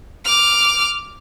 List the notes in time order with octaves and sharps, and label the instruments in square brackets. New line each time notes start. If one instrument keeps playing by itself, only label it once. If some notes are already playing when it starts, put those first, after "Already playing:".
[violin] D6 F6